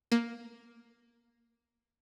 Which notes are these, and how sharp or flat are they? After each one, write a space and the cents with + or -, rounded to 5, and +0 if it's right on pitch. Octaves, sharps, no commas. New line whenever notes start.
A#3 +5